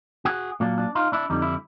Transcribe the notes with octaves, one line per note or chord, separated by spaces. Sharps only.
F#4 G#4
A#2 F#3 A#3 D4
D4
D#4 F4
D4 E4
F2 D3 G3 D#4
E4